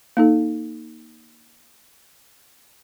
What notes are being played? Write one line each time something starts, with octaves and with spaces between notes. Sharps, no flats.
A#3 D#4 A4